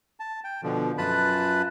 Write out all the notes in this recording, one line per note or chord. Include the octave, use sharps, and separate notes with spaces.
A5
G5
B2 D3 F3
F#2 F4 B4 A5 B5 F#6